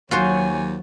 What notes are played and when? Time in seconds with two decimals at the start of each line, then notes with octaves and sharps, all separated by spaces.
0.11 D#2 F#3 F4 F#4 C5 C#5 G#5